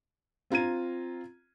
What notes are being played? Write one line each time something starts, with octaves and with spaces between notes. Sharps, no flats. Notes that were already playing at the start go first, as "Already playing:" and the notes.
C4 F4 A#5 G#6 D#7